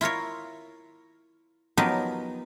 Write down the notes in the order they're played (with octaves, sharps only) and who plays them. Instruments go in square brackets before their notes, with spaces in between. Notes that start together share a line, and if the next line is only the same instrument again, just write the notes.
[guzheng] E4 F4 A#4 C#5
F3 F#3 B3 D#4 G4 A#4